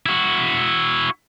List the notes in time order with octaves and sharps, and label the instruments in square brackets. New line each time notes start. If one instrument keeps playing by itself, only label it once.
[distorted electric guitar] E4 F#4